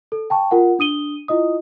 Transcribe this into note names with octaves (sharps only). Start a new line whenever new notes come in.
A4
G5 A5 C#6
F4 A#4 F#5
D4 D#6 D#7 G7
E4 F4 D#5 D#6